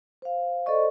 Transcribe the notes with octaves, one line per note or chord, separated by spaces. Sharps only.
C5 F5
A4 C5 D5 D#5 C#6